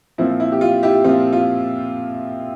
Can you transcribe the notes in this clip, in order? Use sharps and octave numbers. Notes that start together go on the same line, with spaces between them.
A#2 F3 C4 E4
E4
G4
F4
E4 G4
A#2 F3 C4 F4
F4